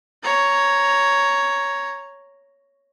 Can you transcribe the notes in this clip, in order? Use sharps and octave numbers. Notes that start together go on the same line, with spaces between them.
C#5 A#5